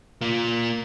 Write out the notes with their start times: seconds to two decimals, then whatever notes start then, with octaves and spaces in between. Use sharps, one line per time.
0.22 A#3 F4